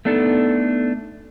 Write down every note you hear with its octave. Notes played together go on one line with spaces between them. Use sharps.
A3 B3 D4 D#4 A4